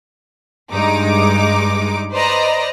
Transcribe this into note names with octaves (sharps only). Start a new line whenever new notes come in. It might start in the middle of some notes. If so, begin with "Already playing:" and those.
G2 G#3 D#4 D6
B4 C5 D5 D#5 A#5